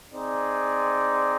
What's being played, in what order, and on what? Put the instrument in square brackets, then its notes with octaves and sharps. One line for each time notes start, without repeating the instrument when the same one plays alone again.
[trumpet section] C4 D#4 G#4 D5